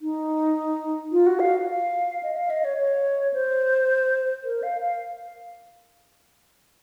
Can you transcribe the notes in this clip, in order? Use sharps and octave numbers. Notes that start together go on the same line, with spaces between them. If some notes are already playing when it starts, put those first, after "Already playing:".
D#4
F4
F#4
F5
F5
D#5
F5
D#5
C#5
C#5
C5
A#4
F5
F5